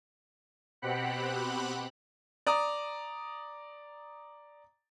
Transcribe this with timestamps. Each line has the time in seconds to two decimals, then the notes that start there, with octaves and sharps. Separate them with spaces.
0.82 B2 C4 G4 F#5 B5 F#6
2.47 D5 A#5 D#6